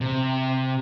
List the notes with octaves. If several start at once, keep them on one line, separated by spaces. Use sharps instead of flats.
C3